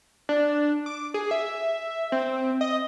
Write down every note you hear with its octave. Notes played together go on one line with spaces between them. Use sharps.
D4
D6
G#4
E5
C4
D#5